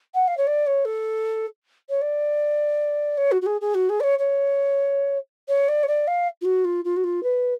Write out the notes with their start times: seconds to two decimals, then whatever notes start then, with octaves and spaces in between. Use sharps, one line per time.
0.14 F#5
0.27 F5
0.37 C#5
0.47 D5
0.66 C#5
0.85 A4
1.89 C#5
2.01 D5
3.17 C#5
3.31 F#4
3.41 F#4
3.46 G#4
3.61 G#4
3.74 F#4
3.89 G#4
4.00 D5
4.03 C#5
4.19 C#5
5.48 C#5
5.68 D5
5.83 C#5
5.87 D5
6.07 F5
6.41 F4
6.45 F#4
6.64 F4
6.84 F4
6.96 F#4
7.03 F4
7.23 B4